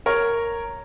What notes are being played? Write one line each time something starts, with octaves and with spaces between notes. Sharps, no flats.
A#4 C#5